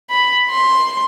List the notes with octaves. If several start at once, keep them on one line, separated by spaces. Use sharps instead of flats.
B5
C6